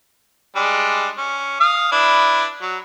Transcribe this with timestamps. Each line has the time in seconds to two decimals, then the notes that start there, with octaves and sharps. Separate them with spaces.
0.56 G3 G#3 D4
1.18 C#4
1.61 F5 D#6 F6
1.92 D4 E4 B4
2.62 F#3